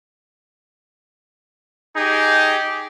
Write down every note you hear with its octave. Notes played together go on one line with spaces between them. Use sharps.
D#4 G4 G#4